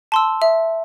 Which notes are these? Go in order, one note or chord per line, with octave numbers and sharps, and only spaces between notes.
A5 C6 E6
E5